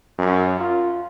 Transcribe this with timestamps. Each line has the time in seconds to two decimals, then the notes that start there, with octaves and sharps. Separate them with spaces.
0.18 F#2
0.60 F4